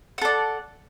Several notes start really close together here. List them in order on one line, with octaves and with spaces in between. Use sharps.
F#5 A4 D5